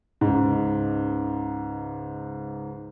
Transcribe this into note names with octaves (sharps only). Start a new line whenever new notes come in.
C#2 G#2